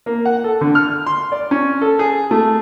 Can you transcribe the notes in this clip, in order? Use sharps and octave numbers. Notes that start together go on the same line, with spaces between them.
A#3
F#5
A4
D3
F6
C6
D5
C#4
A4
G#4
A3